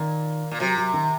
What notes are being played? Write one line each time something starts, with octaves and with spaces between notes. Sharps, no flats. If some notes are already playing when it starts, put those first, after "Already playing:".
Already playing: A#2 D#3
A#2
C3 F#3
F#3
D#3